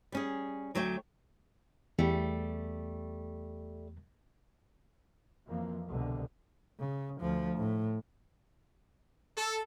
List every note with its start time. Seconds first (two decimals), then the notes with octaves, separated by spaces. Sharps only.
0.12 G3 C#4 G#4
0.75 D2 F#3 A3 C#5 G5
1.99 E2 G3 A3
5.47 F2 E3 F3 A#3
5.89 C2 B2 D3
6.79 C#3
7.21 D2 F3
7.57 A2
9.37 A4